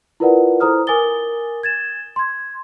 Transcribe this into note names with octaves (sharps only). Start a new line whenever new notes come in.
E4 F4 A#4 B4 D5 F#5
E4 A4 C5 A#5 D#6 F6
A#4 G#5 D6 D#6 A6 G7
G#6 A6 E7
C6 G#6